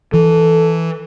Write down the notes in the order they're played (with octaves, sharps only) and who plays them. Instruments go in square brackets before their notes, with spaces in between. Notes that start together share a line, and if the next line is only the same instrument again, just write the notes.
[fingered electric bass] E3 [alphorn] A4